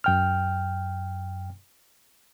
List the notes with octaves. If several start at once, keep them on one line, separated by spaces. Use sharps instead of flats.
F#2 G5 F6